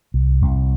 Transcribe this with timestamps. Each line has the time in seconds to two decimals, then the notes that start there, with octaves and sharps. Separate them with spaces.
0.14 C2
0.42 C2